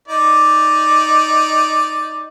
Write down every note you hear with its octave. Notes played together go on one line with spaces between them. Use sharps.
D#4 D5